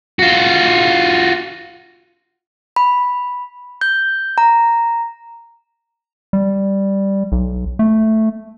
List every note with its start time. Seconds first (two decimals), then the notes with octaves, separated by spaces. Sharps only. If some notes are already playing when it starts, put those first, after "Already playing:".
0.19 F4 F#4
2.76 B5
3.81 G6
4.38 A#5
6.33 G3
7.32 B1
7.79 A3